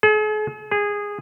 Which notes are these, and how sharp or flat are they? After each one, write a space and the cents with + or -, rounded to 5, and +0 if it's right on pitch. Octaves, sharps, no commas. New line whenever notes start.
G#4 +45
G#4 -15